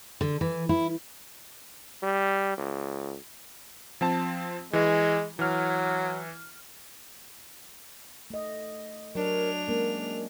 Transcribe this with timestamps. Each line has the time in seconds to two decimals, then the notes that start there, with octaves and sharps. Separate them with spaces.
0.21 D3
0.41 E3
0.69 E4
2.03 G3
2.58 C#2
4.01 F3 C4 A5
4.73 E3 G#3
5.39 E3 F#3 F6
8.30 A3 D#5
9.15 F#3 D4 A#4 C#5 F7
9.68 G#3 A#3 C#4 A#4